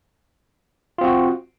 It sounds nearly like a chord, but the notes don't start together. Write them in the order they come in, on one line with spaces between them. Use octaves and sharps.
F4 C4 F#4